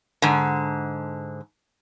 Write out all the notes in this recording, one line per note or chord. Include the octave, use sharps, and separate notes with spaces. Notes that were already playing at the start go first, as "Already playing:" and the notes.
G#2 D3